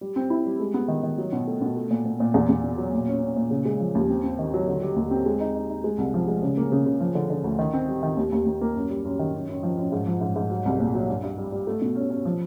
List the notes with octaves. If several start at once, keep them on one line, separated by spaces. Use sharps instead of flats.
G3
C4
E4
G3
G#3
B3
D#3
D#3
F#3
B2
A3
B2
A3
A#2
A#2
A#2
E2
E2
B2
F#3
A#2
C#4
C#4
A#2
C#3
G#3
F3
D#2
C4
C4
D#3
F#3
D3
G3
D#2
C4
G#3
D#4
D#4
D#4
G#3
C2
F3
G#3
C#3
A#3
C#3
C#3
F3
D3
D3
D2
D#3
C4
G3
D#3
D#2
D#2
D#2
A#3
F#2
G3
F#2
D#3
F#2
F#2
F3
F#2
G#2
F3
G#2
G#2
F#3
C2
A#2
F#3
G2
G2
G3
G3
A3
B2
C#4
C#4
F3